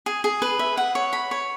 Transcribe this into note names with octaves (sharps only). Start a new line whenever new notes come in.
G#4
G#4
B4
E5
F#5
C#5
B5
C#5